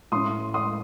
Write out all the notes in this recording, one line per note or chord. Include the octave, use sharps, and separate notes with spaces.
A2 A3 C#4 C6 D#6
C6 D#6